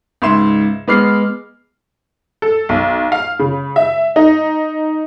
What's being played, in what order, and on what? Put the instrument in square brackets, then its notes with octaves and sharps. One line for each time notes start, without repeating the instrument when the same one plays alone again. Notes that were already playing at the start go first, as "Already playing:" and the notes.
[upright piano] C#2 G#2 E5 C6 E7
G#3 B3 D6 F6 C7
[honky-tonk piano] A4
B1
F5
C#3
E5
D#4